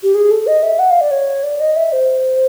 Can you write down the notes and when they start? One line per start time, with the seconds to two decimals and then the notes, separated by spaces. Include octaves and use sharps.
0.03 G4
0.15 G#4
0.31 A4
0.47 D#5
0.63 E5
0.79 F#5
0.91 F5
1.01 D5
1.11 C#5
1.44 D5
1.60 D#5
1.76 E5
1.92 C5